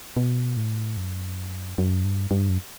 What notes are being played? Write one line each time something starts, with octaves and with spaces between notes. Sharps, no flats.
B2
A2
F#2
F#2
G2
G2
F#2